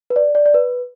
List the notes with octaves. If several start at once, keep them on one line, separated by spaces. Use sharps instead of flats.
B4
D5
D5
D5
B4